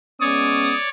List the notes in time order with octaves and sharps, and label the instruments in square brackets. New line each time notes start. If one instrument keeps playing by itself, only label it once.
[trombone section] G#3 B3 C#4 [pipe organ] C#5 D5 [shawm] D#6